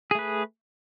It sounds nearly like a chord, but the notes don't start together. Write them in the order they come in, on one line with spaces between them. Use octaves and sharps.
G#4 A3 B4